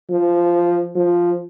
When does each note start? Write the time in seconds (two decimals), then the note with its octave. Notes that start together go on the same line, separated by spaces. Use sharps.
0.10 F3
0.95 F3